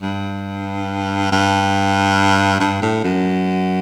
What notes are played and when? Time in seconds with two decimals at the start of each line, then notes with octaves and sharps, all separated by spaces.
0.02 G2
1.32 G2
2.60 G2
2.82 A2
3.04 F#2